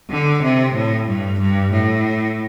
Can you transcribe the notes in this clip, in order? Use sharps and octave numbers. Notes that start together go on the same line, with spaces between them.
D3
C3
A2
G2
G2
A2